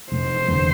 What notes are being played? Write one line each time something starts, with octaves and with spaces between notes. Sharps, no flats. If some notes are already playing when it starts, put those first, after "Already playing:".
F1 C5
E2 D3